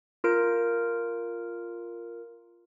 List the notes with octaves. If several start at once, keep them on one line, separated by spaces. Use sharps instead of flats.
F4 A#4 D7